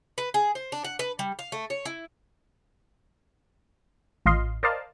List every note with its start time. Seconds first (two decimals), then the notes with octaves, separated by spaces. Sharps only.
0.18 B4
0.34 G#4
0.55 C5
0.72 D4
0.85 F#5
0.99 B4
1.19 G3
1.39 F5
1.52 A3
1.70 C#5
1.85 E4
4.26 A1 F4 D#5 F5 C6
4.63 A#4 C5 D5 D#5 F5 A5